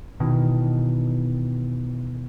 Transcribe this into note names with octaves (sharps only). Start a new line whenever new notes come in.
B2 D#3 E3